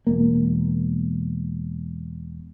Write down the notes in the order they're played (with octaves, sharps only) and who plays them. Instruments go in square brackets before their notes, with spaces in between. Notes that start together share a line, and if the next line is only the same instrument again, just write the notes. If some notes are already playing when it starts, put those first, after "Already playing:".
[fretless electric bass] E1 A#3